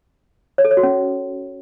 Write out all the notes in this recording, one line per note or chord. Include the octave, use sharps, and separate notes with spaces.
C#5
A4
C#5
F#4
C#4